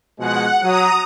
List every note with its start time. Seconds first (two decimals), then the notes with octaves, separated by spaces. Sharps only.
0.19 B2 F3 G#3 F#5
0.62 F#3 A#5 D#6